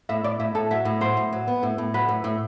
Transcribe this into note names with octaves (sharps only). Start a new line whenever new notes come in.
A2 E5
A2 D5
A2 E5
A2 A4
F#3 E5
A2
F#3 C5
A2
F#3
B3
A2
A2
F#3 B4
A2
A2